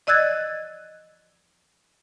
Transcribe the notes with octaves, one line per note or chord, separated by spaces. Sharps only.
D5 D#5 E6 F#6 G#6 A6